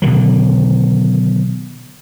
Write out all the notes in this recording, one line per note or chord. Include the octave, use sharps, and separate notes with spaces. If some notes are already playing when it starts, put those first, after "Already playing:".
B2 D3 D#3 F#3